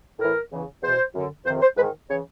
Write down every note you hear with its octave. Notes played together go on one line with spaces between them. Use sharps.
A2 E3 A#4
E2 C#3 E3
E2 B2 C5
F#2 D3
F2 C3 D#3 C5
C5
G#2 D#3 B4
C#3 E3 C#5